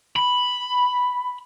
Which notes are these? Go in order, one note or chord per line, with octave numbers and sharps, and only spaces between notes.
B5